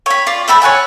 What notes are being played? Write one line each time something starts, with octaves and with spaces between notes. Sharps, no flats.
C#5 B5
F4 D5
A3 A4 B5 E6
C#5 F#5 G#5 A5